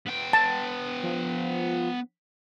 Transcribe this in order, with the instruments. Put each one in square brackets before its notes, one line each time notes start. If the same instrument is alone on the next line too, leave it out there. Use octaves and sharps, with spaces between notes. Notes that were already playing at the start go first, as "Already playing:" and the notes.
[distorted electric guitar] B3 G5
[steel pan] A5
[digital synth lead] F3